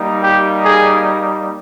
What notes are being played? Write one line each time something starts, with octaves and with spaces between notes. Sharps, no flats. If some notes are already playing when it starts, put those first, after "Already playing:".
Already playing: G3 A#3 D#4
G4
G#4